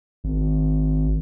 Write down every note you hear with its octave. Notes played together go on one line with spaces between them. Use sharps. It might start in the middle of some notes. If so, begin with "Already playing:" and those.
G#1